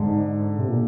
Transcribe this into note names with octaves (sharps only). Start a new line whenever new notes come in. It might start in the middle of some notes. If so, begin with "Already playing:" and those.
Already playing: G#2 D3
C3
A#2